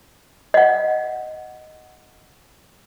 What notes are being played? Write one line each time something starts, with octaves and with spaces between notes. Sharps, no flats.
D#5 F#5